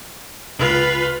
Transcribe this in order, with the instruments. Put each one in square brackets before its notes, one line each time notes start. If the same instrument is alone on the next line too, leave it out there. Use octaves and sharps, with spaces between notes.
[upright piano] C#2 [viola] F4 B4